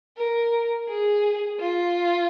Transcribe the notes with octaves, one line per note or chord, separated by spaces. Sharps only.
A#4
G#4
F4